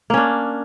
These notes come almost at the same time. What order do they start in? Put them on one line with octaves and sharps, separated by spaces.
A#3 C#4 D4